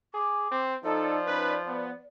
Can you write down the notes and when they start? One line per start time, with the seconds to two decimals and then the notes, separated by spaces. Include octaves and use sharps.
0.14 G#4 D6
0.51 C4
0.84 F3 D#4 A4 D5
1.26 C#4 D#4 B4
1.67 B3